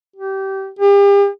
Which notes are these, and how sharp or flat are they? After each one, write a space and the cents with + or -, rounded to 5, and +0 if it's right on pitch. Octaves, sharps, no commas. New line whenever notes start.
G4 -20
G4 +40